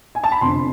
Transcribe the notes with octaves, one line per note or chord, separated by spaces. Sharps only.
G#5
A5
B5
F1 F2 D3 C6